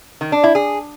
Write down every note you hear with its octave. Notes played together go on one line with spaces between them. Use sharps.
D#3
D4
E4
G#4